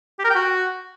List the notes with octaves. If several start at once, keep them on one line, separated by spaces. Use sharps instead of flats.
G4
A#4
G5
F#4